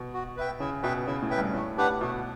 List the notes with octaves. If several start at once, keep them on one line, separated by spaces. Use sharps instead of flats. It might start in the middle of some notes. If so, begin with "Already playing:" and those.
Already playing: B2
F#4
B4 E5 G5
C#3 E4
B2 B4 E5 G5
C#3 E4
A2
B4 E5 G5
G2
A2 A3
D4 G4 B4 F#5
B2 A3